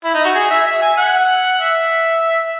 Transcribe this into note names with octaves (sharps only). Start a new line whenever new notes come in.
E4
D#4
F#4
G#4
E5
E5
G#5
F#5
E5